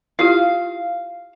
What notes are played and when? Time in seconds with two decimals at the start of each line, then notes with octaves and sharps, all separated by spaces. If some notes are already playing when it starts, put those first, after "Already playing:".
0.19 E4 F4 G4 F5